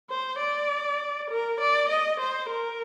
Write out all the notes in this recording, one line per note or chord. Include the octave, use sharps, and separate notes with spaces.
C5
D5
A#4
D5
D#5
C5
A#4